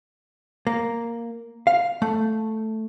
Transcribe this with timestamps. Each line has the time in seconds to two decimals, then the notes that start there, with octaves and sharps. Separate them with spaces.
0.67 A#3
1.67 F5
2.02 A3